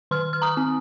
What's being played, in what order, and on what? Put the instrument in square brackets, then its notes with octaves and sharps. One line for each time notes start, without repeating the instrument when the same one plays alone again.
[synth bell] D#3 C6 F6
F6
A#5 D#6
C4